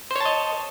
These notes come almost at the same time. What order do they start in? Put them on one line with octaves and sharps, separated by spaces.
C5 C#5 A5 D#5